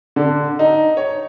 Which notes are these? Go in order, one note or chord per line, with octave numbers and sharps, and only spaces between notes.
D3
D#4
C#5